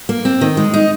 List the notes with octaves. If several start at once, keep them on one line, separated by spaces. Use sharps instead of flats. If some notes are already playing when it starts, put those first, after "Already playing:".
A#3
C4
D#3
G#3
D#4